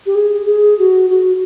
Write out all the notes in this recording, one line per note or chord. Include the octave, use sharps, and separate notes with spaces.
G4
G#4
G#4
F#4
F#4